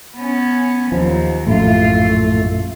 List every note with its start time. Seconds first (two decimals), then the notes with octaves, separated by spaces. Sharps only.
0.16 B3 C#4
0.92 D#2 F3 F#3
1.47 A#1 F#2 A2 A3 F4